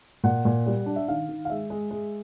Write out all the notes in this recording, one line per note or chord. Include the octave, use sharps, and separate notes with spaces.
A#2 F#5
A#2
G3
D4
E5
D#3 F5
D#3
F5
G#3 E5
G#3
G#3